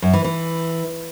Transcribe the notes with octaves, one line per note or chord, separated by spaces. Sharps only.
F#2
E3
E3